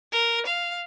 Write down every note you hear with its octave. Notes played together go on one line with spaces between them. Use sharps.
A#4
F5